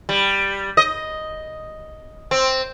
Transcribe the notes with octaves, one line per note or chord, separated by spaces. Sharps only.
G3
D#5
C4